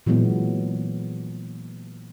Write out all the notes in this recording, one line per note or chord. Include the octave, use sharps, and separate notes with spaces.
A#2 E3 F#3 G#3 B3